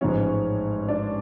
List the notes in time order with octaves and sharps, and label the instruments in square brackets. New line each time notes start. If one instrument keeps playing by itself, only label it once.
[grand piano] A1 G#2 F3 G#3 [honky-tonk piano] C#4
[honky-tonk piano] D4